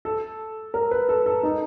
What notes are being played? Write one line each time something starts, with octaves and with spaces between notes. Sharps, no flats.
A4
A#4
B4
A4
A4
D#4